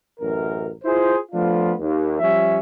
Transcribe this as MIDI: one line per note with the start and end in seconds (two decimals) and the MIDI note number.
0.20 0.69 33
0.20 0.69 42
0.20 0.69 70
0.85 1.15 64
0.85 1.15 65
0.85 1.15 68
0.85 1.15 72
1.32 1.72 53
1.32 1.72 57
1.32 1.72 59
1.32 1.72 62
1.32 1.72 65
1.79 2.18 39
2.19 2.58 53
2.19 2.58 55
2.19 2.58 61
2.19 2.58 76